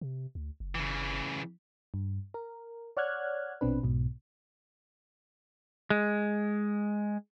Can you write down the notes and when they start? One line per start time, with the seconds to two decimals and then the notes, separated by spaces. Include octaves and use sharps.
0.01 C3
0.35 D2
0.60 F#1
0.75 C#3 E3
1.94 G2
2.34 A#4
2.97 C#5 D5 F#5 F6 F#6 G#6
3.61 A#1 B2 C4 D4 B4
3.83 B1 G#2 B2
5.90 G#3